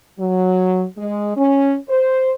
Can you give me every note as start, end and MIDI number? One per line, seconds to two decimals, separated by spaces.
0.20 0.84 54
0.98 1.35 56
1.37 1.76 61
1.89 2.33 72